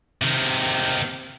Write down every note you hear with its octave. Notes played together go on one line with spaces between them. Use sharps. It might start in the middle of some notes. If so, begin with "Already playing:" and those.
C3 D#3